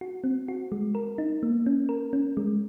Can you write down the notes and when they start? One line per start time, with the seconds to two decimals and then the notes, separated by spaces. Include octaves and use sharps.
0.01 F#4
0.24 C4
0.48 F#4
0.72 G#3
0.95 A#4
1.18 D#4
1.43 A#3
1.66 C#4
1.89 A#4
2.13 C#4
2.37 G#3